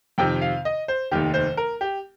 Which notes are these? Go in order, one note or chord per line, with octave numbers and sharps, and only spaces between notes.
F2 C3 D#3 G5
F5
D#5
C5
F1 D#2 D#3 G4
C5
A#4
G4